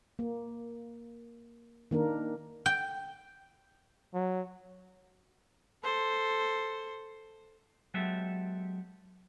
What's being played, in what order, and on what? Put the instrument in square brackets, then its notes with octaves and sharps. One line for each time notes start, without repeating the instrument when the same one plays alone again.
[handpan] A#3
D#3 A#3 D4 A#4
[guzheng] G5
[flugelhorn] F#3
[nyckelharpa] A4 C5
[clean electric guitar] F#3 G#3 B3 G4 A4 E5